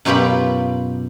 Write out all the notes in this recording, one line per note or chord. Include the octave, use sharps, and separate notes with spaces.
F#2 B2 F4 G4 G5 B5